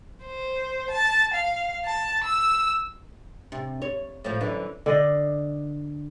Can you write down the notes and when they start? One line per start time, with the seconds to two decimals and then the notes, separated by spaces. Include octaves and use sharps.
0.24 C5
0.91 A5
1.34 F5
1.85 A5
2.22 E6
3.52 C3
3.82 C#5
4.24 A2 F3
4.41 F#2 D3 E3
4.86 D3 D5 D#5